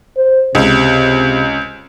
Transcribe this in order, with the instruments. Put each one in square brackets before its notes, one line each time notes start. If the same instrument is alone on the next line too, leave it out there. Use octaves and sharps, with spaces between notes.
[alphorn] C5
[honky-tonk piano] C#2 [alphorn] C3